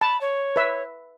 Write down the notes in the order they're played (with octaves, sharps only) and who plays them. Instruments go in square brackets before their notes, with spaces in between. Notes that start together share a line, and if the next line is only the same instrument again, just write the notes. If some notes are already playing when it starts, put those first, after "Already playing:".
[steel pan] A5 [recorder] B5
[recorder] C#5
[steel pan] B4 E5